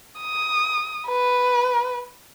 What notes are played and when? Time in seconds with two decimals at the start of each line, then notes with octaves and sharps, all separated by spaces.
0.21 D#6
1.07 B4